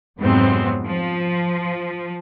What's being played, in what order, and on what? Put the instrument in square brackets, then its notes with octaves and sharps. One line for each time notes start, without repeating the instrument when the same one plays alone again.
[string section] F2 G#2 C3 F#3 B3 C4
F3